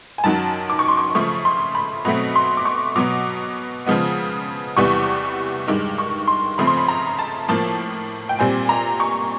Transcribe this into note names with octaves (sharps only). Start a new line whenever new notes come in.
G#5
F#2 D#3 F#3 A5
D6
C#6
C6
C#6
C#3 F3 A3 C#6
C6
B5
B2 F#3 A3 C4 B5
C6
D6
C#6
B2 F#3 B3 D6
C#3 F3 G#3 B3
E2 C3 E3 G3 B3 C#6
G2 D#3 G#3 D6
C#6
C6
C#3 F3 A3 C4 B5
C6
B5
A#5
A5
A2 F3 A#3 A5
G5
A#2 G3 C4 G#5
A#5
C#6